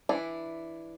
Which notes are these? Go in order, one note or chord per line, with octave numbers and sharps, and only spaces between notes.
E3 D4 E4